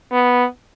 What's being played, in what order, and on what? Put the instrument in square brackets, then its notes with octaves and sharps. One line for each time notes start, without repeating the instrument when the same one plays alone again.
[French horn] B3